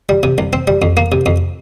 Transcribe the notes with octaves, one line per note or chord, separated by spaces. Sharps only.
G3
C3
C2
C4
G3
F2
A#3
C3
F2